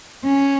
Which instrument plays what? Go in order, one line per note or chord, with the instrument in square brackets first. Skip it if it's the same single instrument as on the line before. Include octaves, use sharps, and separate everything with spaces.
[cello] C#4